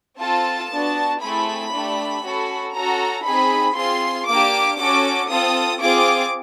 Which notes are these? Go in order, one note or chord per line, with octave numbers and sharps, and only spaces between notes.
C4 F4 A4 A5
B3 D4 F#4
A3 C4 E4 G#4 B5
A3 D4 G4
C#4 F#4 A4
C#4 F#4 A4 A#5
C4 D#4 G#4 B5
C4 F4 G#4 C6
A#3 D4 G4 D6
C#4 F#4 A4 D6
C4 F4 A4 D#6
C4 F4 G#4 D6